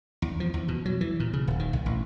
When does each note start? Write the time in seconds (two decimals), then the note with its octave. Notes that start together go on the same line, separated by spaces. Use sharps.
0.22 E2
0.40 F3
0.54 E2
0.68 B2
0.85 F#3
1.01 E3
1.20 A#2
1.33 C#3
1.47 D#1
1.59 D#3
1.73 B1
1.86 A1